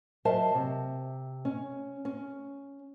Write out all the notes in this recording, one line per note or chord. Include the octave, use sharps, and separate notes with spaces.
F#3 A#4 C5 D#5 E5 A5
C3
C#4
C#4